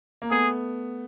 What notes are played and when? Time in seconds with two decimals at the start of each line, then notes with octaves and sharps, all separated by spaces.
0.22 A#3
0.31 A3 B3 G#4